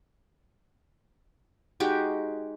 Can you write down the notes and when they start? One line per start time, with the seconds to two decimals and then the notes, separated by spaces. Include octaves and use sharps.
1.80 G#3 D#4 F#4 G4